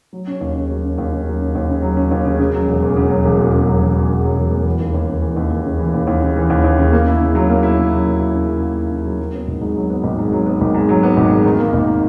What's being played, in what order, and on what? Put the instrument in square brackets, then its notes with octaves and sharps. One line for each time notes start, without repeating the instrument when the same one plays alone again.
[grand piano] F#3
C#4
D#2
C#3
F#3
C#4
D#2
C#3
F#3
C#4
D#2
C#3
F#3
C#4
D#2
C#3
C#3
F#3
E1
E2
C#3
F#3
E1
E2
C#3
F#3
E1
E2
C#3
F#3
E1
E2
E3
D#2
D#2
C#3
E3
D#2
D#2
C#3
E3
D#2
D#2
C#3
E3
D#2
D#2
C#3
A#3
E4
C#3
F#3
A#3
E4
C#3
F#3
A#3
E4
C#3
F#3
A#3
E4
C#3
F#3
F#3
B3
G#1
G#2
F#3
B3
G#1
G#2
F#3
B3
G#1
G#2
F#3
B3
G#1
G#2
D#3
A#3
G#1